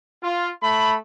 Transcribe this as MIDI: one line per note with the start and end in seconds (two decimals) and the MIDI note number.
0.22 0.48 65
0.63 0.94 57
0.63 0.94 83